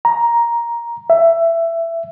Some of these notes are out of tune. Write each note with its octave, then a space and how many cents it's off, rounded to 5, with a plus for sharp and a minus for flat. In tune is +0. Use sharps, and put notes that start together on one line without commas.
A#5 +10
E5 +15